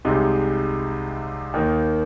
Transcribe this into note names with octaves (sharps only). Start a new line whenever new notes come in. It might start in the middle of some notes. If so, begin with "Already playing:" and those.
C2 C3 G#3 D#4
D#2 D#3 A#3 D#4